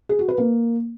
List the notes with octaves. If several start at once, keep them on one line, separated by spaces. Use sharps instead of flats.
G#4
F#4
B4
A#3